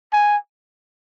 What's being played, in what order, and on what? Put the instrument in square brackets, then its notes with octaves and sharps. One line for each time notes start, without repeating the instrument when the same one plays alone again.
[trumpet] G#5